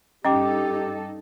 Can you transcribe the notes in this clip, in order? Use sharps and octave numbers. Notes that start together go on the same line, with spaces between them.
G2 C#4 D#4 G4 A4 D#5 G5 D6